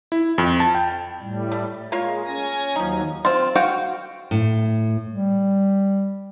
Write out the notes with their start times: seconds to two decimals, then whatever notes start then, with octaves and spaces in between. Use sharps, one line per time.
0.12 E4
0.38 F2
0.60 A5
0.75 G5
1.21 A2 G3
1.52 A3
1.92 G#3 A#3 F4 C#5
2.27 C#4 G#5 A#6
2.76 D#2 F3 F#3 D#4
3.25 C4 F4
3.55 F#4 F5 G5
4.31 A2
5.12 G3